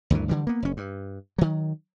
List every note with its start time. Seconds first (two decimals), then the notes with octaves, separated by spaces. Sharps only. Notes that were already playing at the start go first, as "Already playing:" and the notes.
0.10 D2 G2 D#3 E3
0.29 D3 E3 G3
0.47 A#3 B3
0.62 F#1 C#4
0.77 G2
1.38 D#3 F#3